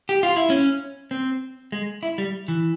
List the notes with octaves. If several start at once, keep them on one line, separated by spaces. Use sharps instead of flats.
G4
F4
E4
C#4
C4
G#3
E4
G3
E3